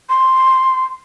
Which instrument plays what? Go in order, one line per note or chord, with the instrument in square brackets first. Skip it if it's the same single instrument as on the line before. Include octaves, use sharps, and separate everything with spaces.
[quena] C6